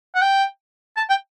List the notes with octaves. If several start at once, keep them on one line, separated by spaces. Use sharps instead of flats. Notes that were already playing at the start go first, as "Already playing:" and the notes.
F#5
G5
A5
G5